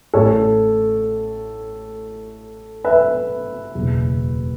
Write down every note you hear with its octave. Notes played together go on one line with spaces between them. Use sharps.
A1 A2 A3 A4 C#5
B4 E5
F#1 E2 B2 F#3